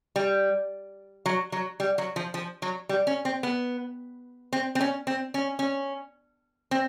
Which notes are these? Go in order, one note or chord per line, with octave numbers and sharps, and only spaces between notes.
G3
F#3
F#3
G3
F#3
F3
F3
F#3
G3
C#4
C4
B3
C4
C4
C#4
C4
C#4
C#4
C4